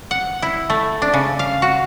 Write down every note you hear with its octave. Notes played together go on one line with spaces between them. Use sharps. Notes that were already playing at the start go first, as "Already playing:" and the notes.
F#5
E4
A3
D4
C#3
F5
F#4